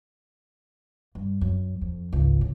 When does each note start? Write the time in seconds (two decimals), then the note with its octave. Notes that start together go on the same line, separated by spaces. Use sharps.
1.15 G2
1.41 F#2
1.81 F2
2.13 G#1 C#2
2.40 C#3 E3